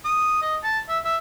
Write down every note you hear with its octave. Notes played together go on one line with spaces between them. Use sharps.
D#6
D#5
A5
E5
E5